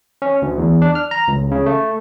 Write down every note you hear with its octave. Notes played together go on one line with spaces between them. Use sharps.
C#4
D2
E2
D4
F6
A#5
C#2
C#3
A3